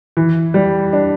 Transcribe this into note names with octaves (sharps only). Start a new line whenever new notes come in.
E3
G3
D4